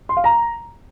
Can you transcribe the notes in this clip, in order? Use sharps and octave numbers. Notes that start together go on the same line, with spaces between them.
C6
F5
A#5